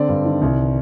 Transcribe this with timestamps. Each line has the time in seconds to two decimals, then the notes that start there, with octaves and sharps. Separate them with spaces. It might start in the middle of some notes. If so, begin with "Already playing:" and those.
Already playing: D3 C4 D5
0.08 G2
0.25 D#3
0.42 C2